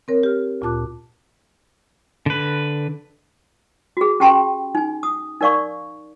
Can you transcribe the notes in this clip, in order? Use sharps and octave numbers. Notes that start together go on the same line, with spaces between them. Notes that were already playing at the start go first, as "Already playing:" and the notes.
C4 A#4 C#5
G4 F6
D2 A#2 F4 A5 D6 F#6
D3 B4
F#4 G#4
C#4 G4 G5 A5 C6
D#4 G#5
D#6
D#4 A#4 D5 F5 C#6